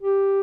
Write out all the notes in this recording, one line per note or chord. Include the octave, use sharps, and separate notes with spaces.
G4